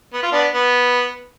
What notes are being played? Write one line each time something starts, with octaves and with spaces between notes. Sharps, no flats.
B3
F4
B3 D4
B3